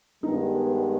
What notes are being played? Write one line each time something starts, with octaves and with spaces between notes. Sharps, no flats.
G2 D#3 G#3 B3 D#4